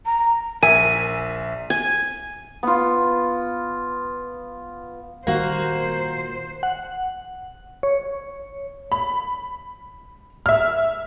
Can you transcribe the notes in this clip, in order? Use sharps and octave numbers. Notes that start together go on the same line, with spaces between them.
A#5
A#1 A#4 E5 G#5 D#7
G#5
B3 F4
A#2 D#3 G3 A#3 F#4 C5
F#5
C#5
B5
E5 F6